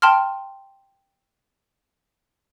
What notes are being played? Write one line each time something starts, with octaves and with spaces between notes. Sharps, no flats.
G5 A5 C6 F6